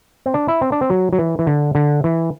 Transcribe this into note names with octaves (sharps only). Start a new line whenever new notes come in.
C4
D4
E4
C4
D4
C4
F#3
F#3
E3
E3
D3
D3
E3